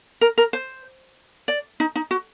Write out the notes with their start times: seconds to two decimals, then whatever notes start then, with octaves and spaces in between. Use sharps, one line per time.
0.21 A#4
0.38 A#4
0.53 C5
1.48 D5
1.80 D#4
1.96 D#4
2.11 F#4